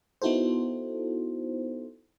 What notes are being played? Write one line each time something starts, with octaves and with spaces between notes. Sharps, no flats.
B3 D#4 E4 F#4 A4 C5